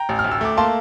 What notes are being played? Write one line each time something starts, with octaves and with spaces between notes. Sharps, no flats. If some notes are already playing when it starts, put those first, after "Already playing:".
Already playing: G5 A#5
A1
F6
D2
E6
A3 D6
A#3 A5 C6